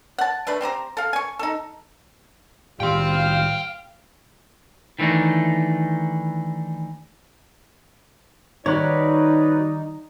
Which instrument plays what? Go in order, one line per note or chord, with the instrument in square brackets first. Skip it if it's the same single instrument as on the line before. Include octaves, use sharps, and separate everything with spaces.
[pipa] F#5 A5
A3 D4 B4
C4 G4 C5 A#5
A4 F5
G#5 C#6
D#4 A4
[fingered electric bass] A2 D#3 [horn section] G3 F4 [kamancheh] F5 [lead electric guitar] G5 C6
[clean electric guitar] D#3 E3 A3 D4 D#4
[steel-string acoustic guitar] D#3 [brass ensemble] G3 D5 [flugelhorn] D#4 [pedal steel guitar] F#4 B4 C#5